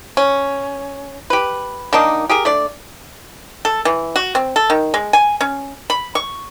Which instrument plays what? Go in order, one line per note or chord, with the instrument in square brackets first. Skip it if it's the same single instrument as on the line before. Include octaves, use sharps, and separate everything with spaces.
[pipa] C#4
G4 B4
D#3 A#3 D4 D#4
G4 G#4 A#4
A3 D4 D5
A4
E3
F#4
C4
A4
D#3
G#3
G#5
C#4
B5
C#6